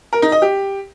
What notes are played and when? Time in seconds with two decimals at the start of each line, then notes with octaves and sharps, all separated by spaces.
0.13 A#4
0.22 D#4
0.32 D#5
0.42 G4